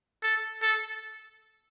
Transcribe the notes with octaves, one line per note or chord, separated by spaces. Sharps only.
A4
A4